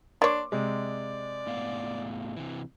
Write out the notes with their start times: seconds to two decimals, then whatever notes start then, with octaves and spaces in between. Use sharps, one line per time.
0.22 A#3 D4 C#5 C6 D6
0.52 C3 G#3 D5
1.47 A2 B3 F5
2.37 C3 E3